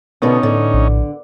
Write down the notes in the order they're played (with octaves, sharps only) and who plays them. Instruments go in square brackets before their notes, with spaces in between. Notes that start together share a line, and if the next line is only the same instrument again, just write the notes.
[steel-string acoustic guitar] B2 D3 B3 [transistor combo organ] C#4 D#4
[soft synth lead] A2 [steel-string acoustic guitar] D3
[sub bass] A#1